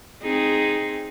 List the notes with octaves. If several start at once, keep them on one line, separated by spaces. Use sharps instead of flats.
C4 D#4 G#4